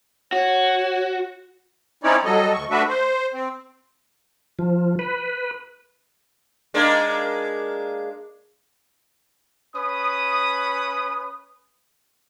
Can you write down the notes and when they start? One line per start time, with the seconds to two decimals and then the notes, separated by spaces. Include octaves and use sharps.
0.32 F#4 C#5
2.04 C4 C#4 D#4 E4 C#5 D5
2.25 F#3 G3 A4 D#5
2.53 D2 C#6
2.70 A3 D4 F#4 B4 E5
2.89 C5
3.33 C4
4.59 F3
4.99 B4
6.74 G#3 A#3 D4
9.75 C#4 B4 D#6